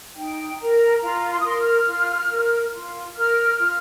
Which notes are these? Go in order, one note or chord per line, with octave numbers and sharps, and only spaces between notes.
D#4 G5
A#4 A#5
F4 A#5
C6
D#6
A#4 C6
F6
F4
A#4
F4
A#4 F6
F4 F6